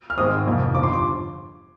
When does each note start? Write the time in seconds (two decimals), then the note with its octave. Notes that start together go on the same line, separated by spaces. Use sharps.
0.10 F6
0.18 G#1 G#2 D#3 G#3 C4 D#6
0.46 F1 F2 D#3 A#3
0.74 G1 G2 F3 D6
0.83 C6
0.93 D6